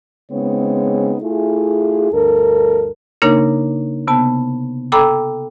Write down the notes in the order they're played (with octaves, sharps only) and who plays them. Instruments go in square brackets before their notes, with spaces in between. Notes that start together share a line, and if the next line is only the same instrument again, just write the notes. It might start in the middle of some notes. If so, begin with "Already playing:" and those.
[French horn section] C#3 G#3 B3 C4 D#4 C#5
A3 E4 F4 G#4
D2 G2 A4 A#4
[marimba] C#3 A#3 D4 D#4 A#4 C#5
C3 B3 A5
A4 G5 A#5 B5 D6 E6